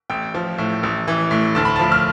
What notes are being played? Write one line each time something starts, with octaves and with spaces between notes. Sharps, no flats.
A1 G5
F3
A2
A1
E3
A2
D2 A5
B5
A5
F3
F6